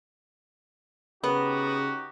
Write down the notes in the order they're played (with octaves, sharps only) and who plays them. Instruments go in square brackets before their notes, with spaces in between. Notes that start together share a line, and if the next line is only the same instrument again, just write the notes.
[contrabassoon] C#3 [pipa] B3 [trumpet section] D#4 F#4 G4